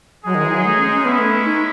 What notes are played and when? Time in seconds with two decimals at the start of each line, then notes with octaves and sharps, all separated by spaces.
0.24 F#3 G#3 D#4 G#4
0.35 D#3
0.45 E3
0.54 F#3
0.65 A3
0.78 C#4
0.92 C#4
1.04 G#3 B3 C#4 E4
1.18 A3
1.45 D#4